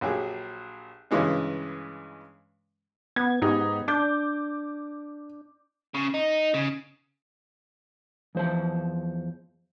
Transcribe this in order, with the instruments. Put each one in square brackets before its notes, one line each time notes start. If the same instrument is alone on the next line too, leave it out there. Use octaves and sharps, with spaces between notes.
[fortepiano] A#1 F#3 G4 G#4
G2 C#3 E3 G#3 C#4
[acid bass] B3 [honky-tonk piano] G#6
[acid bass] G#2 [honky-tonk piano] B3 D#4 G4
[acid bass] D4 [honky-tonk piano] D6 G6
[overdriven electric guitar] C#3
D#4
C#3
[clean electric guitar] E2 F3 C5 E5 A5